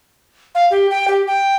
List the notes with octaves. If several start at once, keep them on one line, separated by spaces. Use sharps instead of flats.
F5
G4
G5
G4
G5